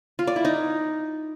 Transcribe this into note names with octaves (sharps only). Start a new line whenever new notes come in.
F4
D5
E4
D#4